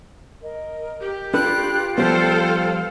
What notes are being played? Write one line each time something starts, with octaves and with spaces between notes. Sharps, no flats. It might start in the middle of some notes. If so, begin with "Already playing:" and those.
A#4 D#5
G4
D4 F4 A4 B4 G5 F#6
F3 G3 B3 A4 C5 F5